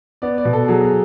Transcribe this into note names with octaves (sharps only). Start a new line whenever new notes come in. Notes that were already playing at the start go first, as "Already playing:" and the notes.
B3 D5
D5
B2
A4
F#3 G#4
G#4